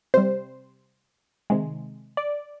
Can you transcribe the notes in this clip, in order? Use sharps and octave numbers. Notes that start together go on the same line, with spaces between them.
C3 G3 C5
C3 D#3 G#3
D5